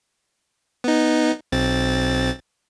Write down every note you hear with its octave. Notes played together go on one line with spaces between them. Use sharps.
B3 D#4
B1 C4 A6